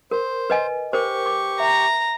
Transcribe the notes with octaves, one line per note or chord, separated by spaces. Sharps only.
A#4 C5
B4 D#5 G#5
G4 A#4 C5 C#6
D6
E5 A#5